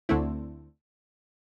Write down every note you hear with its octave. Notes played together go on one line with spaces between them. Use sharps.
D2 D3 A3 C4 E4